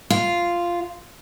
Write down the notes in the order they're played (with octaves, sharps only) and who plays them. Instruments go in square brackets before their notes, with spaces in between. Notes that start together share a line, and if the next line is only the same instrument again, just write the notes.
[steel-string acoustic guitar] F4